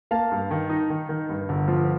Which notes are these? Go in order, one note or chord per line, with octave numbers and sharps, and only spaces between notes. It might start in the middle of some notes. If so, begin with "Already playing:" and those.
A#3 F5 A5
G2
D#3
D#4
D#3
D#3
G2
G1
F3